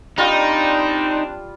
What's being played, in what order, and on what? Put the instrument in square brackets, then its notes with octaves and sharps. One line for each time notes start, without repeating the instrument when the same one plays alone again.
[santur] G3 F4 [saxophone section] C4 D4 [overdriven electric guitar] D#4